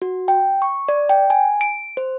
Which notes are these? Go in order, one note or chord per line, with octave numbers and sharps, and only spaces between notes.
F#4
G5
C#6
D5
G5
G#5
D7
C5